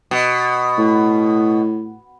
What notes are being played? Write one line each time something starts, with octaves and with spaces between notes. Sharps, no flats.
B2
A2